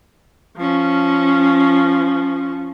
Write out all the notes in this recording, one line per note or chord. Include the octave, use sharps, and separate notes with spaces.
F3 C#4